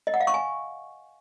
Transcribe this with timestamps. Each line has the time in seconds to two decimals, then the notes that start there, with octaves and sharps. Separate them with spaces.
0.07 D#5
0.14 F#5
0.20 F5
0.27 C#6
0.34 G#5